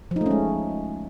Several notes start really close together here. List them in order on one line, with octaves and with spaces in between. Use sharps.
F3 D#4 A3 C#4 G#3